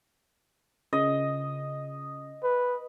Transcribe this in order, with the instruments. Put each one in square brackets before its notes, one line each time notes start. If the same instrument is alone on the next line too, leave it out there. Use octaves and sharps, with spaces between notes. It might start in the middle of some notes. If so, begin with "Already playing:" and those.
[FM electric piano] C#3 [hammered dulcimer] D#5
[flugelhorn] B4